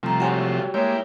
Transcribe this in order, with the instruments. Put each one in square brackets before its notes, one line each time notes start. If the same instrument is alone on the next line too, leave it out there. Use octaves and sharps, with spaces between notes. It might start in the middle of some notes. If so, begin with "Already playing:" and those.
[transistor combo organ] C3 F3 A3 [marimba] G3 A#5
[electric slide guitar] F#4 G4 C#5 [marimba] F#5 G#5 C6
[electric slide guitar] G#3 [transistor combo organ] A#3 E4 G4 [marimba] C#5